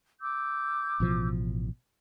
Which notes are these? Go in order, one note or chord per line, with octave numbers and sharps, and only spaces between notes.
D6 E6 G6
A1 B2 F3